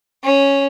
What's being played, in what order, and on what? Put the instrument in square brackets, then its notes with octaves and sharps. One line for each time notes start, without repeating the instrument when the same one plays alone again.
[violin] C#4